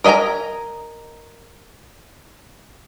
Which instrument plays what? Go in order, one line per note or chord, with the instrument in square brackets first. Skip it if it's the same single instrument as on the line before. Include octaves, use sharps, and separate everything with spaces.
[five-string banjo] A#4 D#5 E5 G#5 A#5